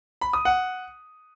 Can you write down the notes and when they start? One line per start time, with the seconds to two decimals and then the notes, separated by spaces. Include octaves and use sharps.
0.21 B5
0.33 D#6
0.45 F#5